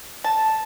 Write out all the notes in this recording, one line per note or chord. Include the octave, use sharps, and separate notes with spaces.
A5